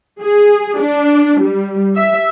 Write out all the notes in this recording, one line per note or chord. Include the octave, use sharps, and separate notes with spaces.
G#4
D4
G3
E5